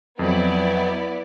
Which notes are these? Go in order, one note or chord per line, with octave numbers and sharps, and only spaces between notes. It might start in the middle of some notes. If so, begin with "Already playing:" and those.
F2 F#3 B3 E4 D5